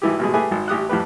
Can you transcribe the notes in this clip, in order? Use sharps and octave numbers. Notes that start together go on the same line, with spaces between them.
G#1 E3 G4
A1 B2 G#3
A3 G4 G#4 B4 G#5
G#1
A1 G4 D#6 F#6
F2 A2 G4 B4